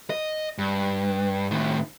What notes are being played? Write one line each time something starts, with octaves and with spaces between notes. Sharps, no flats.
D#5
G2
A2 D#3